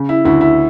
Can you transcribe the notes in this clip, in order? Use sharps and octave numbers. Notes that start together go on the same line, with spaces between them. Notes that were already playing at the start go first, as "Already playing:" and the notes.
Already playing: C#3
E4
D2 E4
E4